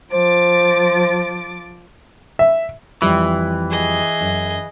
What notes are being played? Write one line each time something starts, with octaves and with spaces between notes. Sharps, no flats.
F3 C5 D6 A6
E5
F2 E3 G3
G#4 D#5
F#2